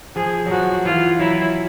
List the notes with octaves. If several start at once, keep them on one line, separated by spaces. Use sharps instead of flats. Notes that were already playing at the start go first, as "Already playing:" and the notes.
F3 G#4
F#3
F3 F#4
E3 F4
F#3 E4